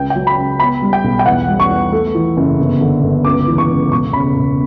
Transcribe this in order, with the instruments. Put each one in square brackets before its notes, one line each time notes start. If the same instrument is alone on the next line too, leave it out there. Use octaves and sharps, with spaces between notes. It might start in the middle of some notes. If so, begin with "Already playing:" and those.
Already playing: [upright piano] C#2 G5
G5
F#3
B5
C#2
B3 B5
G3
G5
B1
G5
E2 F#5
G3
C#6
E2
A3
E3
F#1
G1
D3
G1
C#2 D6
E3
C#6
C#2
E1 C#6
C#3 B5
E1